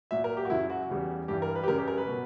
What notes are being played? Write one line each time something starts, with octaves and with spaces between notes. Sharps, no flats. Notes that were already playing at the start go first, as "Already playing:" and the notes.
A#2 F#3 E5
A#4
G4
F#4
F#2 C#3 F#3 E4
F#4
E2 C#3 G3
G2 E3 G3 G4
A#4
B4
G4
F#2 C#3 G3 A#4
G4
A#4
B4
B2 F#3